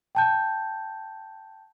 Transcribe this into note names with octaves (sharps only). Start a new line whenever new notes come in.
G5 A5 G6